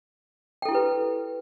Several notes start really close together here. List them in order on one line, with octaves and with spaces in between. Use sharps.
G5 A4 E4 G4 B4